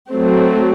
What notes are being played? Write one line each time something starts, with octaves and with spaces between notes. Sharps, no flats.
F#3 A3 C4